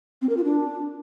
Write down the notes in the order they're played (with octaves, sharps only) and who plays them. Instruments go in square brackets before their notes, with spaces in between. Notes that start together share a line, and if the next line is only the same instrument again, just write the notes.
[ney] C4
A#4
F4
D4